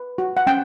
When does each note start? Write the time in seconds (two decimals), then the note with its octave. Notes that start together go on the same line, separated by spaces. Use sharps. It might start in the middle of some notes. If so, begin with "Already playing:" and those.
Already playing: B4
0.18 F#4
0.37 F#5
0.47 C#4 G5